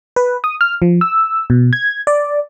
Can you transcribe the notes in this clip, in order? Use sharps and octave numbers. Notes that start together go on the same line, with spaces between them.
B4
D#6
F6
F3
E6
B2
G#6
D5